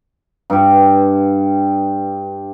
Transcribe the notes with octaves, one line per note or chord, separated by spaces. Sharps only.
G2 G4